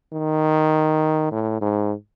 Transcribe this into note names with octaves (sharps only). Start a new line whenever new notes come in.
D#3
A2
G#2